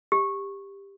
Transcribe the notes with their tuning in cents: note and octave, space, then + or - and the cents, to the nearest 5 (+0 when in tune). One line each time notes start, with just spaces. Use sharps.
G4 +15